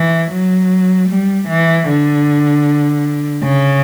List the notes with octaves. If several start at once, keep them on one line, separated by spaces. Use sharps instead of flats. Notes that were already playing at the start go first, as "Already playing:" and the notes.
Already playing: E3
F#3
G3
E3
D3
C#3